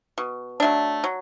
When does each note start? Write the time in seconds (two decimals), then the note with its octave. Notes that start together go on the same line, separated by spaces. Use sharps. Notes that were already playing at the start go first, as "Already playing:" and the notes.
0.18 B2
0.60 F#3 A3 D4
1.04 F#3